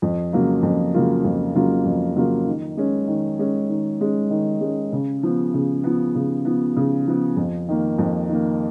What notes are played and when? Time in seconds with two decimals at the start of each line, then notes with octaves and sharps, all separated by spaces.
0.02 F2
0.33 C#3 F#3 A#3 F4
0.63 F2
0.94 C#3 F#3 A#3 F4
1.25 F2
1.55 C#3 F#3 A#3 F4
1.85 F2
2.16 C#3 F#3 A#3 F4
2.47 D#3
2.77 G#3 C#4
3.08 D#3
3.39 G#3 C#4
3.69 D#3
4.01 G#3 C#4
4.30 D#3
4.61 G#3 C#4
4.92 C#3
5.23 F3 B3
5.54 C#3
5.84 F3 B3
6.15 C#3
6.45 F3 B3
6.77 C#3
7.07 F3 B3
7.37 F2
7.69 D#3 A#3
7.98 F2
8.29 D#3 A#3